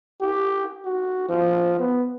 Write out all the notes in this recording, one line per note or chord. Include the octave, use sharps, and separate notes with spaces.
G4
F#4
F3
B3